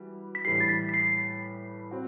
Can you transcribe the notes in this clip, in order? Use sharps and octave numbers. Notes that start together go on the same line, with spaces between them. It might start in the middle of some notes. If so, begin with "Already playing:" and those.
Already playing: E3 G3 F#4
B6
A2 E3 G3 C7
A6
B6
B6
C7
C4 F#4